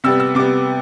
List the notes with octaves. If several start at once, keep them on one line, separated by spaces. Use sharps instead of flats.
C3 G3 B3 E6
E6
C3 G3 B3 D6